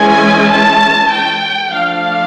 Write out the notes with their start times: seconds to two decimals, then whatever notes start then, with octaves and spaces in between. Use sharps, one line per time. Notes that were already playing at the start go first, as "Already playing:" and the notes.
Already playing: E3 G#3 C#4 G#5
0.49 A5
1.10 G5
1.72 F3 A3 D4 F5